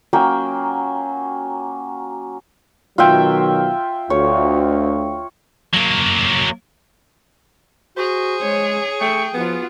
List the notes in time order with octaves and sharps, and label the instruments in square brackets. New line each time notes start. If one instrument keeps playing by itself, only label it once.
[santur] F#3 A#3 C#4 G5
[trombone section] B2 D#3 F#3 [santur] F4 E5 G5
[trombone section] D2 [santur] C#5
[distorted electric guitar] F#3 A#3
[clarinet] F#4 [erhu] G#4 [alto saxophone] C5
[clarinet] G#3 [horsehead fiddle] C#5
[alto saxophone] A3 [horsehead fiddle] G5 [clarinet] C#6
[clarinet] F3 [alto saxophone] B3 [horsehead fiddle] F4 F#4